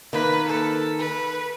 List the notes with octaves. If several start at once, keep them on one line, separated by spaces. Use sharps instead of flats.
D#3 A#3 B4
A4
B4